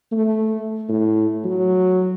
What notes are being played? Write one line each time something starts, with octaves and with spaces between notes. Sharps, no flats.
A3
A2
F#3